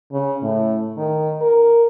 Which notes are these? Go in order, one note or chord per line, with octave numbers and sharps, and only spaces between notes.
C#3
A2
D#3
A#4